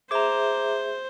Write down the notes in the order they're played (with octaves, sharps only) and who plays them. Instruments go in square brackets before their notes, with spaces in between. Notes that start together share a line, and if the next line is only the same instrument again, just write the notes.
[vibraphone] G#4 E5 [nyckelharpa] C5 [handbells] A#5 D6